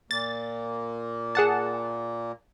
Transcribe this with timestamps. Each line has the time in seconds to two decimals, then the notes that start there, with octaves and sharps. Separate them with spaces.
0.11 A#2 A#3 A6
1.35 G#4 F#5 A5